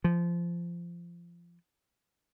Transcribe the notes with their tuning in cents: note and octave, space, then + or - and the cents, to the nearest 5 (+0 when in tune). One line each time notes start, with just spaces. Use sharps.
F3 -20